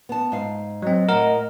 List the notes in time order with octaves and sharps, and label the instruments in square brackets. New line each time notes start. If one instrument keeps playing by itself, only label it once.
[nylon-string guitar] B3 A5
G#2 F5
[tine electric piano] F#3 C4 [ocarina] D#5
[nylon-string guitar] A2 F#5 [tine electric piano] A#4